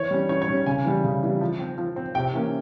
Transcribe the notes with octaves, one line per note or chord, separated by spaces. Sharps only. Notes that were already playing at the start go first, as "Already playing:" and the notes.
Already playing: E3 C#5
G3 C#4
E3 C#5
C#5
G3 C#4
C#3 G#5
E3 G3
C#3
E3 G3
F3
C4
F3
C4
C3 G5
E3 A#3 C#4